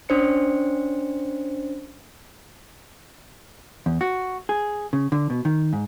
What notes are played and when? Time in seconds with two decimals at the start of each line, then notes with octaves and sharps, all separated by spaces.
0.09 C#4 D4 C5 C#7
3.86 E2
4.01 F#4
4.49 G#4
4.93 C#3
5.12 D3
5.30 B2
5.45 D#3
5.73 G#2